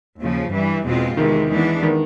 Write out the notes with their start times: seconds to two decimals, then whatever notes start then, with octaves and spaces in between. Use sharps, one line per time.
0.20 D#2 C#3 F3
0.51 G2 E3 G3
0.85 E2 B2 G#3 C4 F4
1.17 E2 C3 D#3 E3 G#3
1.50 E3 G#3 B3 D4
1.83 D#3